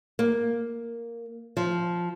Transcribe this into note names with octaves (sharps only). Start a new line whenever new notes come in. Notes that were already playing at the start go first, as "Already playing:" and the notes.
A#3
F3